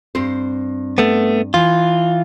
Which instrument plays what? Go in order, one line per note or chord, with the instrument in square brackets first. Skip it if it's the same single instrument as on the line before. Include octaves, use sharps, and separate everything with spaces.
[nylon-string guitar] G2 C4 C5
[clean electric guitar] A3 B3
[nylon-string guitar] E3 [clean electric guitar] F4